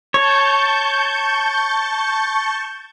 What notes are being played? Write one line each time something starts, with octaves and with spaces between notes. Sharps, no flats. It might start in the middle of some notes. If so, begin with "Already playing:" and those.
C#5 A5 C#6 G6